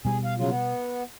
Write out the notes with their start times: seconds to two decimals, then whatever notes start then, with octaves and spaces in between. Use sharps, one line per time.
0.05 B2 G3 G#4
0.24 F5
0.38 C#3 F#3 F4
0.50 B3